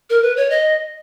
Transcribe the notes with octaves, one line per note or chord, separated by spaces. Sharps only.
A#4
B4
C#5
D#5